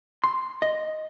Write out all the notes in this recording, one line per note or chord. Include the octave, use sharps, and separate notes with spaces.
C6
D#5